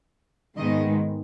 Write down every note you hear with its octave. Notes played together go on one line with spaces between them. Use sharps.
G#2 D#3 G#3 B3 D#5